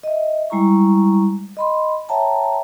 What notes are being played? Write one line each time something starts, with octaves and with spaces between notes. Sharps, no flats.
D#5 E5
G3 G#3 E4 A#5 C#6
D#5 B5 C6
C#5 E5 G5 A5 A#5